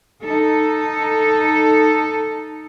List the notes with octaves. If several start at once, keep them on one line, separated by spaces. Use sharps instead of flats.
D#4 A4